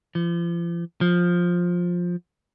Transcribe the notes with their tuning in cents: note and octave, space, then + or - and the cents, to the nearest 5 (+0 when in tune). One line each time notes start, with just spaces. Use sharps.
F3 -40
F3 +10